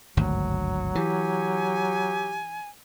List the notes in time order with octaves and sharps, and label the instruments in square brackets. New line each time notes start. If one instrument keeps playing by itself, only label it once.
[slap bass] G#1 D2 G2 [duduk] F#3
[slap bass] E3 [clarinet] G4 [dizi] G#5